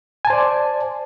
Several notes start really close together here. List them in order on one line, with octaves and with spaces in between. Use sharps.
G#5 A5 C5 D5